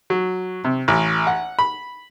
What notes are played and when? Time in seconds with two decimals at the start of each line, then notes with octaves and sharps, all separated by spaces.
0.10 F#3
0.65 C3
0.88 A1
1.27 F#5
1.59 B5